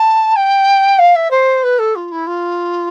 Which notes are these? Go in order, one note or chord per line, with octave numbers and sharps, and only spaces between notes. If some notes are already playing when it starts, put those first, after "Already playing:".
Already playing: A5
G5
F5
E5
C5
B4
A4
F4
E4
F4